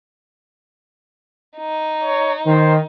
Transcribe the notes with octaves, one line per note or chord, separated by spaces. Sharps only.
D#4
C#5
D#3 C5